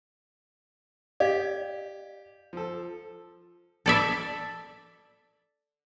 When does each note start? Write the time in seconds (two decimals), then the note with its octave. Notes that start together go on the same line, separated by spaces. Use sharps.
1.20 G4 D5 D#5 F5
2.53 F3 A4
3.86 A4 D5 E5